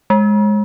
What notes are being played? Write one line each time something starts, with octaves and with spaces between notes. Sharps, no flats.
G#3